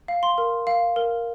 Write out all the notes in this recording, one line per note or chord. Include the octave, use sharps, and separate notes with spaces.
F5
C6
A#4
F5
A#4